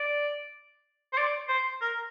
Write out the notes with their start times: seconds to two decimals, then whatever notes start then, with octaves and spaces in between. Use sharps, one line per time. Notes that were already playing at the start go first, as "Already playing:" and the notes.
Already playing: D5
1.13 C5
1.18 D5
1.48 C5
1.81 A#4